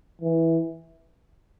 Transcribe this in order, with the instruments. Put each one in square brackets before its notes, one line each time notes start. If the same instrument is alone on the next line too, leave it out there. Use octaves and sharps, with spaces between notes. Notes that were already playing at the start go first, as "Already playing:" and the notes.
[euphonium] E3